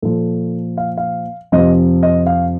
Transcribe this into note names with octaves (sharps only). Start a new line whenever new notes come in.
A#2 F3 A4
F5
F5
F2 C3 F3 D#5
D#5
F5